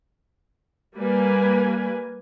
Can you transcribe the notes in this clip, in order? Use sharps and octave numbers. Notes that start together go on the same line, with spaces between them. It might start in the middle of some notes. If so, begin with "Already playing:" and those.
G3 A#3 B4 G#5